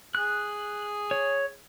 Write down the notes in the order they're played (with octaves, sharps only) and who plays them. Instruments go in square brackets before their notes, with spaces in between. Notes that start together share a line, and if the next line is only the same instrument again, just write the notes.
[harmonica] G#4 [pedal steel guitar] F#6
[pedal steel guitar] C#5